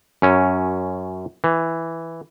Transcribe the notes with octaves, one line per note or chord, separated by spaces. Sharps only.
F#2 C#4
E3